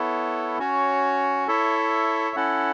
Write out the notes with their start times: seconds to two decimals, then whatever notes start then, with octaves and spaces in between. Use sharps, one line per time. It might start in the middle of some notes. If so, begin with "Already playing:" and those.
Already playing: B3 E4 A4 C#5
0.59 C#4 F#4 C#5
1.48 E4 A4 C#5 E5
2.36 C#4 E4 A4 F#5